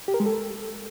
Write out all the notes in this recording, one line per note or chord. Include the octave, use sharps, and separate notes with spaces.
G4
A#4
G#3
A4